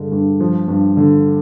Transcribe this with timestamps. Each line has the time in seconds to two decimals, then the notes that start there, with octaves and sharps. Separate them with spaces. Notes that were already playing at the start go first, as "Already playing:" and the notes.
Already playing: G2 D3 G#3
0.12 G2
0.40 F3
0.68 G2
0.97 D3